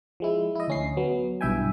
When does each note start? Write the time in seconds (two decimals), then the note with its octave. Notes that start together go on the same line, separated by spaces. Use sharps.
0.20 F3 G#3 E4
0.55 E4 D#5
0.68 D2 C#4 C7
0.97 F#3 B3
1.41 B1 G2 E4 E5 G5 G#5